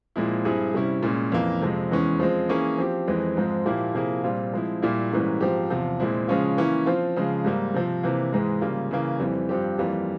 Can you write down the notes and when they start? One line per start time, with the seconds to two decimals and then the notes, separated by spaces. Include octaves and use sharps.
0.16 A#2 F3 G#3 C4 E4
0.45 G2 G3 C4 E4 G#4
0.74 C3 G3 C#4 E4
1.03 A#2 G#3 C#4
1.32 F2 E3 A#3
1.62 F2 C3 F3 G#3
1.91 E2 E3 G#3 C#4
2.20 F3 G#3 C4
2.49 E3 A#3 C#4 E4 G#4
2.78 F3 C4 G4
3.08 F2 E3 G#3 C4
3.37 G#2 F3 G#3 C4
3.66 A#2 F3 A#3 E4 G4
3.95 C3 F3 A#3 E4 G#4
4.24 A#2 G3 C4 F4
4.53 F3 G#3 C4 E4
4.82 A#2 G3 A#3 E4
5.12 G#2 E3 G3 A#3 C#4
5.41 G#2 F3 C4 G4
5.70 E2 C3 F3
6.00 A#2 G#3 C4 E4
6.28 C#3 F3 G#3 C#4 F4
6.57 E3 A#3 C#4 E4
6.86 F3 C4 F4
7.16 C#3 F3 G#3
7.44 G#2 G3 A#3
7.74 C3 F3 C4
8.03 C3 E3 A#3
8.33 G#2 E3 G#3
8.61 C#3 G3 A#3 F4
8.91 C#3 E3 A#3
9.20 F2 E3 G3 C4
9.49 G2 F3 C4 G4
9.78 F2 E3 G3 A#3 F4